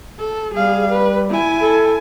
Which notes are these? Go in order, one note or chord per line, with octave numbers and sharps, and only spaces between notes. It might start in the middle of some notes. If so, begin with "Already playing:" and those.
A4
G3 G#4 F5
B4
E4 G#5
A4